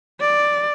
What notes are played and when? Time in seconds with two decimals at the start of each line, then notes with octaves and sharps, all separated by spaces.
0.21 D5